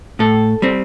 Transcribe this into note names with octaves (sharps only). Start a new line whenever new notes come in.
A2 A4
G3 C4